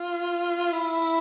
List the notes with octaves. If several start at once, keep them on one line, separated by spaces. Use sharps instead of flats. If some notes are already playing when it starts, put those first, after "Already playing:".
Already playing: F4
E4